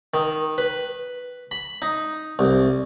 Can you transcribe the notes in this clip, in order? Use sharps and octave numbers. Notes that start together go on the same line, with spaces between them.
D#3
B4
B5
D#4
C2